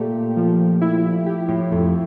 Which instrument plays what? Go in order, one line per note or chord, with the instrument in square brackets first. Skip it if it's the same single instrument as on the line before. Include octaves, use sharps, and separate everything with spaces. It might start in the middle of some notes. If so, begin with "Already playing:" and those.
Already playing: [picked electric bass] A#2 [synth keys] A3 G4
[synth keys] F3
E4
G4
[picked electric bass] A2
[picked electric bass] F2 [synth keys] A3